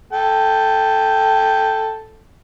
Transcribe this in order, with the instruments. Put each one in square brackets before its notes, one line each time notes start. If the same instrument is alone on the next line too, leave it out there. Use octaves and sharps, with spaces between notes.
[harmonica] A4 G5